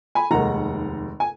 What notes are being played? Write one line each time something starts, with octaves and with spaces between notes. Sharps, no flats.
G#5 B5
F1 D#2 D#3 G#3 F#5 A#5
G#5